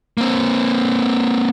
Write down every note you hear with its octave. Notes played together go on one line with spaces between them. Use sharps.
A#3 C4